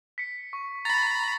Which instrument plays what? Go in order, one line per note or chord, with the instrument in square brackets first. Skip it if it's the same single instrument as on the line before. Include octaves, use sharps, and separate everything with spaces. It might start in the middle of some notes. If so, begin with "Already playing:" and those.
[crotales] B6 C#7
C#6
[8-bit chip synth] A#5 B5 [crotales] A6